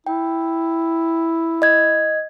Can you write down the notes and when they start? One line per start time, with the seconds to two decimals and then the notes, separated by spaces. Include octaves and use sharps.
0.07 E4 G5
1.62 D#5 G#6